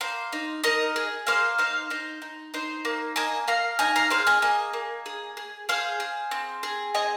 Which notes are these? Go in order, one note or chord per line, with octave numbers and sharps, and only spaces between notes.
A#3 C5
D#4
D#4 A#4 D#5
G#4
A#3 C5 F5
D#4 C5 F5
D#4 C5
D#4
D#4 C5
A#3
A#3 D#5 G#5
A#3 F5 A#5
D#4 D#5 G#5
F5 A#5
G#4 C5 F5
D#5 G#5
A#3 D#5 G#5
A#3
G#4
G#4
G#4 C5 F5
G#4
C4
G#4
C4 D#5 G#5